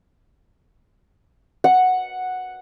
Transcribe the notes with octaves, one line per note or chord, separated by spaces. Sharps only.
F#5